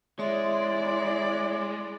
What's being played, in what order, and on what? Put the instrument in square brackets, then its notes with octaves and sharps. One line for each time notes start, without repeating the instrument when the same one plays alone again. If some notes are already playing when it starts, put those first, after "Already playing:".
[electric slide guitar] G#3 [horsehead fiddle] E4 D5 [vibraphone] C#5 E5 C6